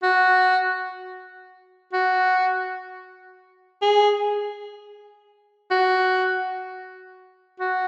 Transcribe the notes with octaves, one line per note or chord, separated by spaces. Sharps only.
F#4
F#4
G#4
F#4
F#4